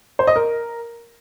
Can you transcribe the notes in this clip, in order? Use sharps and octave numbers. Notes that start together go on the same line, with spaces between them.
C5
D#5
A#4